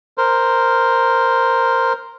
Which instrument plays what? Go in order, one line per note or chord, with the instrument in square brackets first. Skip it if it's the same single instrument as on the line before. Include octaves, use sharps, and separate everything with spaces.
[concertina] A#4 C5